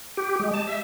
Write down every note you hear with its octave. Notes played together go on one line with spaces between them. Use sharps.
G4
G#3
A5
E5